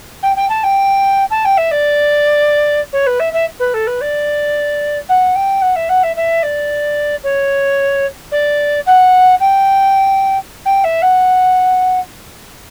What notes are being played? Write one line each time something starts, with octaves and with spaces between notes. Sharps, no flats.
G5
G5
A5
G5
A5
G5
E5
D5
C#5
B4
E5
E5
B4
A4
B4
D5
F#5
G5
F#5
E5
F#5
E5
E5
D5
C#5
D5
F#5
G5
G5
E5
F#5